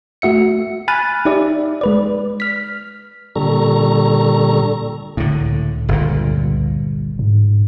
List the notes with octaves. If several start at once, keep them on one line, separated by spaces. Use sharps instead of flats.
A3 F#4 E5 C#7
G#5 B5 F6 F#6 A6 D#7
D#4 G4 D5 E5
G#3 B4 D5
F6 B6
A#2 D3 G3 A4 A#5 C#6
C#2 A2 D3
G1 A#2
G#2